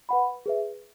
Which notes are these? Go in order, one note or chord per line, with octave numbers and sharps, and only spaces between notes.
B4 F#5 B5
G#4 B4 E5